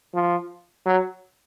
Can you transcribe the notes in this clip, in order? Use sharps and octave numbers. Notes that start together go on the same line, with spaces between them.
F3
F#3